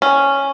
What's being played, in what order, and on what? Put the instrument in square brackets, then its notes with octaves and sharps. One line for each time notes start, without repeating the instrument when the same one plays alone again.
[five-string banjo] C#4